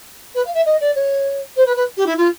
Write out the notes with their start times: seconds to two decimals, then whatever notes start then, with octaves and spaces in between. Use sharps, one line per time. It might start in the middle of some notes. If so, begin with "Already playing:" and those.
0.34 B4
0.45 F5
0.54 E5
0.65 D#5
0.80 D5
0.95 C#5
1.56 C5
1.66 B4
1.76 B4
1.97 G4
2.06 E4
2.17 F4